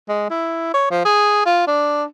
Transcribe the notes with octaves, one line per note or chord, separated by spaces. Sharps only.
G#3
E4
C#5
F3
G#4
F4
D4